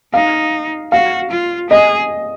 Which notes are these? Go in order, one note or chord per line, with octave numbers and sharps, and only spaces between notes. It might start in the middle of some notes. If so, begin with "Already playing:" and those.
D#4 F5
F#4 F5
F4
G#4 D#5